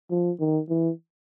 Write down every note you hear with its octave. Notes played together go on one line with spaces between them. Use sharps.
F3
D#3
E3